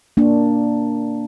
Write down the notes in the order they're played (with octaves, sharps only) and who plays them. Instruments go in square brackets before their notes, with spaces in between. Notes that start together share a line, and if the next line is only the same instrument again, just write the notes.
[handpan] A#3 D4